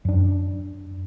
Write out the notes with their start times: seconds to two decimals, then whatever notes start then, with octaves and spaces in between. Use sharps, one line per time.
0.05 F#2 D4